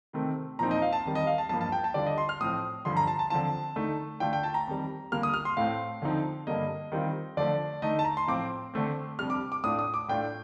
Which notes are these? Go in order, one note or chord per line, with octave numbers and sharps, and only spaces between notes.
C3 D#3 A3 C4
A#2 F3 C4 D#4 A#5
D#5
F5
A5
F2 D#3 G3
D#5
F5
A5
G2 F3 A#3 A5
A5
G5
A5
D3 G3 D4 F4 D5
D#5
C6
F6
A2 F3 C4 D#6
G2 D3 F3 C6
A#5
A5
A5
D3 F3 C4 F4 A5
D3 A3 D#4
D3 A3 D4 F4 G5
G5
A5
A#5
F2 D#3 G3
D3 G3 A#3 F4 F6
D#6
F6
C6
A2 A3 C4 F5
D3 F3 C4 D#4
G2 D3 G3 A#3 D#5
D#3 G3 C4 F4
D3 F3 A3 D4 F4 D5
D3 A3 D#4 D#5
A5
A#5
C6
A2 F3 C4 F4 D6
D3 A3 C4
F2 C3 G3 D4 F6
D6
D6
A2 A3 D4 F4 D#6
D#6
D6
A2 A3 D4 F4 G5